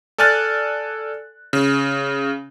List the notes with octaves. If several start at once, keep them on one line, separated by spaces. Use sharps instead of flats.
A4 D5 G#5 F6 F#6 A6
C#3